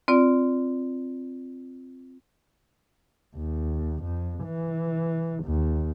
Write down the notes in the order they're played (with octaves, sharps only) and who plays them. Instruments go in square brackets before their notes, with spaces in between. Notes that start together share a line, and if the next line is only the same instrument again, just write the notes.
[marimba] C4 F4 D5
[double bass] D#2
F2
E3
D#2